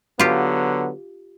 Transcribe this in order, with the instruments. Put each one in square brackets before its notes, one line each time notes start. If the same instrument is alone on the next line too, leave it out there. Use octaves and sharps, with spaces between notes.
[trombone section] D3 F#3 B3 [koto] F4 G4